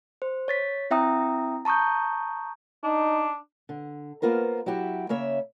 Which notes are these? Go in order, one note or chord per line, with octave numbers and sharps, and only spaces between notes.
C5
C#5 A6 B6
C4 E4 E5 G5 A#5 D#6
A5 A#5 C#6 D#6 G6
D4 D#4
D3
A#3 B3 F4 A#4 C5
F#3 E4 F#4 G4
C#3 A#3 C#5 E5